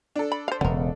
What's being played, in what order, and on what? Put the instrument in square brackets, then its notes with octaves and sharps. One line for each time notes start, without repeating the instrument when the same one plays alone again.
[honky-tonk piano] D4 A4
[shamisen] B5
C5 F5
[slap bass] E1 C#3 [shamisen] B3 A#4